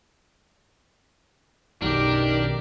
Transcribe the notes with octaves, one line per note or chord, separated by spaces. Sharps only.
B1 F#2 D#3 D4 G4 A#4